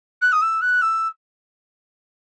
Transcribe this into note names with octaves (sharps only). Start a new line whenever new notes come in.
F#6
D#6
E6
F#6
E6